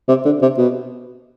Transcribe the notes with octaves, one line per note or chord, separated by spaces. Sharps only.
C3
D3
C3
B2